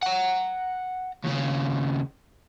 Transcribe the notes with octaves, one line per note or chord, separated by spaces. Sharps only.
F#5 A#5
D#2 C#3